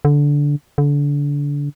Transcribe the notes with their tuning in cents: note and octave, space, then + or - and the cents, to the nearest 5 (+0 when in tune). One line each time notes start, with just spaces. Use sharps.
D3 -15
D3 -30